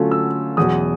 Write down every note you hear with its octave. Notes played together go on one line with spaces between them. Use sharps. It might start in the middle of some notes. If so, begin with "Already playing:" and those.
Already playing: D3 F#3 A3 C#4 F4
E6
E2 B2 F#3 D#6